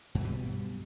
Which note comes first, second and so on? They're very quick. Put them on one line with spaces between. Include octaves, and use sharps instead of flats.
G2 F#3 G3 B2